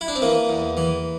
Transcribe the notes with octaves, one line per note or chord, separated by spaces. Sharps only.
E4
D4
C4
E3 A#3
E2
E3